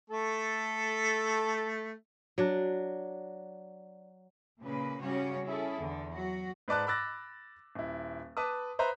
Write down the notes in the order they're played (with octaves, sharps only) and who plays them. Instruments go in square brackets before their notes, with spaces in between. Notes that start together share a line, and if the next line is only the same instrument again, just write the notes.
[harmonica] A3 A4
[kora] F#3 D4
[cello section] A#2 C#3 A#3 B4
C#3 G3 C#4 F#4 C#5
C#4 E4 G#4 A4
E2 D3
F#3 F#4
[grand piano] G#2 B4 D5 A5 F#6
B5 D6 E6 F#6 A6 A#6
D#1 E4
B4 A5 B5 D6 D#6
B4 C5 E5 A#5